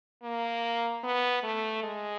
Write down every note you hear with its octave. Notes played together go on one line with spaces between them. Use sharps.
A#3
B3
A3
G#3